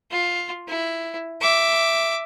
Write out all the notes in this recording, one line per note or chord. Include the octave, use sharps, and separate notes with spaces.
F4
E4
E5 D6